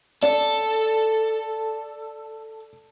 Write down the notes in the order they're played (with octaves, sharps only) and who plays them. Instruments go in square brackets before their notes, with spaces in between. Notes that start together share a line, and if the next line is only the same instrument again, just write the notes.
[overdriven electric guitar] A4 [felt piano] D5